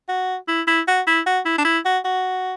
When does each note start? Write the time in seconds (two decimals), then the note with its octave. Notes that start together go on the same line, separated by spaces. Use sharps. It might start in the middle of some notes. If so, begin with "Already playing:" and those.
0.09 F#4
0.48 E4
0.67 E4
0.88 F#4
1.07 E4
1.26 F#4
1.45 E4
1.58 D4
1.65 E4
1.85 F#4
2.05 F#4